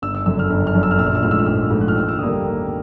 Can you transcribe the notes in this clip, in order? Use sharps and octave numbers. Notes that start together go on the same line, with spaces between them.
G1 E6
E6
F#2 D3 E6
F6
G1
F6
F#2 D3
E6
F6
A#1 E6
F6
E6
G#2 F3 A3 F6
E6
F6
A#1 E6
G#2 F3 A3
F#6
F6
D#2 E6
E6
D3 G3 A#3 D#6
D#2
A#3